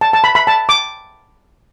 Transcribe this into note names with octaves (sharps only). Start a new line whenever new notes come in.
A5
A5
B5
B5
A5
D6